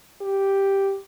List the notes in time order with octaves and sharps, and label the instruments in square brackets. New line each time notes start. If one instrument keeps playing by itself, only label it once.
[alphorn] G4